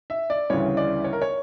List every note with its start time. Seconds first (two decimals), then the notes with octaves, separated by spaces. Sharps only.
0.10 E5
0.30 D5
0.50 D2 C#3 E3 G3 C#5
0.77 D5
1.04 C#5
1.13 A#4
1.22 C#5